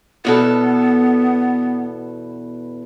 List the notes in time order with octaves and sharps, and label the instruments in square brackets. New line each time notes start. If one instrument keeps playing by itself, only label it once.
[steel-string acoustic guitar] E2 B2 A4 [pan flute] B3